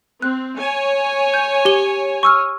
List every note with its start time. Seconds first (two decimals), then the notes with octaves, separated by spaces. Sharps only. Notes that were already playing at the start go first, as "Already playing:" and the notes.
0.22 C4 F#6
0.57 C#5 G#5
1.34 G6
1.65 G4 G7
2.23 C#6 E6 F6